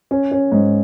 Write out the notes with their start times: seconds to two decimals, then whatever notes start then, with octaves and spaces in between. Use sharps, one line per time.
0.11 C#4
0.32 C#4
0.52 G#2